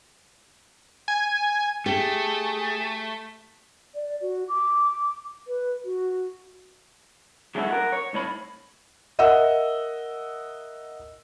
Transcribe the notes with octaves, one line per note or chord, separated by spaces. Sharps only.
G#5
A3 G4 G#4
D5
F#4
D6
B4
F#4
F#3 G#3 A3 C#4 E4 F#4
A#4 F#5
C#5
C2 A2 C#5 B5
A#4 D#5 E5 F#5 E6